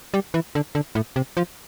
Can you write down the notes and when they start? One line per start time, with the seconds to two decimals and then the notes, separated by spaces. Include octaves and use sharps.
0.14 G3
0.34 E3
0.55 D3
0.75 D3
0.95 A2
1.16 C3
1.37 F3